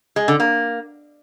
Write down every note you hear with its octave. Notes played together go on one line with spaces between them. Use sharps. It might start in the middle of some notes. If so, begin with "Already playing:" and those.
G#3
D3
A#3